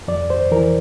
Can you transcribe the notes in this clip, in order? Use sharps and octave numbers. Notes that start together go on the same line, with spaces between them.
F2 D5
C5
E3 A#4